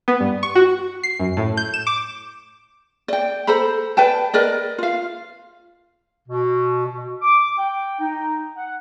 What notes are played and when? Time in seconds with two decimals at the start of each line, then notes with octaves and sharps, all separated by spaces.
0.08 B3
0.20 G2
0.43 C#6
0.55 F#4
1.03 C7
1.19 F#2
1.37 A2
1.57 G6
1.74 E7
1.87 D6
3.08 D5 G5
3.47 A4 C5 A#5 B5
3.97 B4 D5 G5 A5
4.33 A#4 B4 D5 D#5
4.78 F4 F5
6.28 B2
6.85 B2
7.22 D6
7.58 G5
7.99 D#4
8.56 F#5